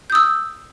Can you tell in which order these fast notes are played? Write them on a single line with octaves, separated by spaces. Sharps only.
G6 D#6 E6